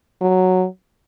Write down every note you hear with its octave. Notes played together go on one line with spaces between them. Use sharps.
F#3